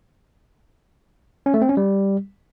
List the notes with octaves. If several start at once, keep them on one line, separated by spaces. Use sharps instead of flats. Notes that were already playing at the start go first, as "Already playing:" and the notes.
C#4
A3
C4
C#4
G3